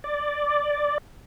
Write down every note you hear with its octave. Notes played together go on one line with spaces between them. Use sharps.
D5